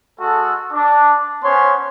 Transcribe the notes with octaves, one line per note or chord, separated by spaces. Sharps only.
G#3 F#4 A4
D4
B3 C#4 C5 C#5 C6